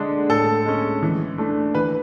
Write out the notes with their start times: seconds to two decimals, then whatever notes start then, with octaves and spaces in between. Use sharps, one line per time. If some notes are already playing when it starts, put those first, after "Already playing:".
Already playing: D3 G#3 D4
0.29 A2 A4
0.66 G#3 C#4
1.03 E3
1.38 A3 D4
1.75 E3 B4